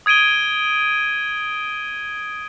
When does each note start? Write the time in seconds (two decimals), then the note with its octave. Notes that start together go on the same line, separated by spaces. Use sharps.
0.06 D#6 G#6 D7 D#7 G7